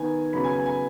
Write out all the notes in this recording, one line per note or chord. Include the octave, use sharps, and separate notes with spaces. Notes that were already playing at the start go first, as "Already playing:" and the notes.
Already playing: D#3 B3 G#5
C#3 F#3 B3 B5
G#5
G#5
G#5